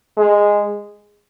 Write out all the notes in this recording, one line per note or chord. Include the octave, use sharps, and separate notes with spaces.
G#3